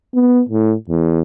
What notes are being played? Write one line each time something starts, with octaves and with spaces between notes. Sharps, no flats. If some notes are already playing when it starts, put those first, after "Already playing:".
B3
A2
E2